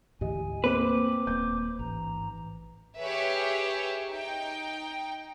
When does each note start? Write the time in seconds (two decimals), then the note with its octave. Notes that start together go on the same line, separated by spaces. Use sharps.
0.21 D2 G#2 E3 G4 D#5 G#5
0.64 A#3 C4 B4 C5 D6
1.27 D#1 A#3 G6
1.79 A1 G#2 E3 A#5
2.99 G4 G#4 B4 C#5 E5
4.10 D#4 G5